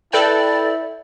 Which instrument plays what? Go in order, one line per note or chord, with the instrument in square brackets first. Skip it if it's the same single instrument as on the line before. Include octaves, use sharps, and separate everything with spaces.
[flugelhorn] E4 [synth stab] A4 B4 G5 [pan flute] D5